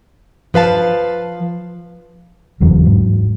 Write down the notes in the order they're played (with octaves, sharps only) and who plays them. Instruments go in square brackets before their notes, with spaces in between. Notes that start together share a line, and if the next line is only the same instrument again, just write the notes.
[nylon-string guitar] F3 B4 F5 A5
[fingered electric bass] F#1 E2 E3 F#3
G#2 F#3